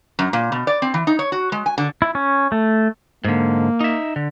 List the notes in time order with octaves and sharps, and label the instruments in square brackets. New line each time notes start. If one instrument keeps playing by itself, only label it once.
[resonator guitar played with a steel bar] F#2
A#2
B2
D5
C4
E3
D#4
C#5
F#4
G#3
G#5
D3
[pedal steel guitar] E4
C#4
A3
[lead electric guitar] G#2 D3 [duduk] A#3
[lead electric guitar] D#4 E5
D3